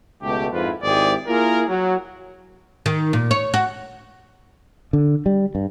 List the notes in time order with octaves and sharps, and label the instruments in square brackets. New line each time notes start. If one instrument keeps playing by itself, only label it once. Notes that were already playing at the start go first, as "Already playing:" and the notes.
[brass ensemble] C#2 B2 G#3 A3 G4
F2 G#2 F3 E4 F4 B4
G#1 G#2 E4 G4 G#4 D5
A#3 E4 F4 G#4 A#4
F#3
[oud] D#3
A#2
C#5
F#4
[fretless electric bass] D3
G3
G2